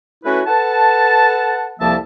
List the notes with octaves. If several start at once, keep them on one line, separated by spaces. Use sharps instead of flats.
A3 C#4 E4 F#4 B4
A4 B4 F#5 A5
C2 F2 F3 A#3 E5 A5